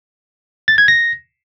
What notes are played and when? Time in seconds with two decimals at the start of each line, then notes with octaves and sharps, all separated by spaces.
0.68 A6
0.78 G#6
0.88 A#6